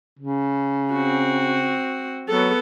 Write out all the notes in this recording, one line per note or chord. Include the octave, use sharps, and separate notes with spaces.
C#3
C4 F#4
F#3 B3 A4